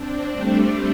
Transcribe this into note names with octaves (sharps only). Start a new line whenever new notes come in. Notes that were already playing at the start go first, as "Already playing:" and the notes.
Already playing: C4 D4
G3 A3